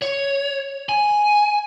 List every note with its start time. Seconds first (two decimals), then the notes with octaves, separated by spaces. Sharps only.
0.02 C#5
0.89 G#5